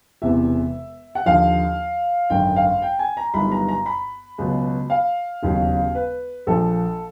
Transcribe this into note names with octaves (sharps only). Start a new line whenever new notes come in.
E1 E2 C3 E5
F#5
D#2 D3 F3 F5
G#1 F#2 D3 G5
F5
G5
G#5
A#5
G1 G2 D#3 F#3 B5
A#5
A#5
B5
C#2 B2 F#3
F5
E1 D#2 C#3 F#3
B4
A#1 A#2 F3 A4